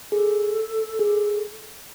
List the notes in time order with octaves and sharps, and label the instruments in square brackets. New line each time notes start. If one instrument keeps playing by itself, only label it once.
[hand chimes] G#4 [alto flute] A4
[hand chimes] G#4